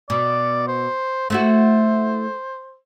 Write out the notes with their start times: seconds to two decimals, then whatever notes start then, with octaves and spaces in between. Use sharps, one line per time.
0.10 B2 D5
0.68 C5
1.30 A3 E4 F#4 C5